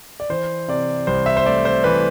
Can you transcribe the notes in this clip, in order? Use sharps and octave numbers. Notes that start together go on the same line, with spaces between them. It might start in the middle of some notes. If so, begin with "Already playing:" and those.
D5
E3 C5
C3 D5
C2 C5
E5
C5
A3 D5
C5
E3 B4